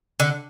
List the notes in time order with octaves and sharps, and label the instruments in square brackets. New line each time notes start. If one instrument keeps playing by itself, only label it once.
[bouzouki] D3